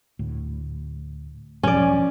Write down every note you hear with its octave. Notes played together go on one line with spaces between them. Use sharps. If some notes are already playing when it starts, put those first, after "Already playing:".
D2 A2
E1 B2 F3 C#4 D5